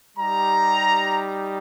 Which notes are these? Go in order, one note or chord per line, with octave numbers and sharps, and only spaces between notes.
G3 D#4 G4 A#5